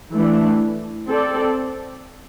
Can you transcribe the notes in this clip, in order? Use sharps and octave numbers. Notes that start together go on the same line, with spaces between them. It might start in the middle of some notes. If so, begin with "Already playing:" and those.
E3 A3 D4
C4 A4 D5